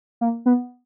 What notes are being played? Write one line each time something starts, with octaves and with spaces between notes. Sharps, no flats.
A#3
B3